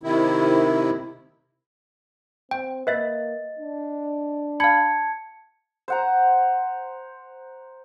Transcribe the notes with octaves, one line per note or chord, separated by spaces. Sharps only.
C3 D#3 E4
C4 G5
A#3 B4 D#5 E5 A6
D4
F5 A5 B5 G#6 C#7
C5 F#5 A#5